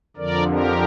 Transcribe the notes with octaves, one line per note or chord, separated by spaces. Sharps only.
F2 D3 F3 A#4 D5
G4 A#4